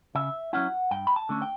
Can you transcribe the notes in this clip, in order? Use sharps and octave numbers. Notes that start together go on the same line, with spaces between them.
C#3 E5
F#3 C#4 E4 F#5
G2 G5
B5
A5
D3 A3 C#4
G5